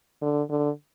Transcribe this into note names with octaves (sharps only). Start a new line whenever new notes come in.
D3
D3